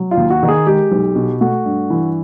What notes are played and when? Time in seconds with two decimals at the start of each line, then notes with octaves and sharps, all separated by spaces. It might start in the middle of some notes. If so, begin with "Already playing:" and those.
Already playing: F#3
0.11 F4
0.17 D#2
0.30 F#4
0.43 D#3
0.48 G#4
0.66 G#3 G4
0.92 B1
1.15 B2
1.41 A3 F#4
1.65 G2
1.90 E3